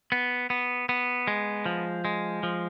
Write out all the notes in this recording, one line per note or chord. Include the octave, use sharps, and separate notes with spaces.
B3
B3
B3
G#3
F3
G#3
F3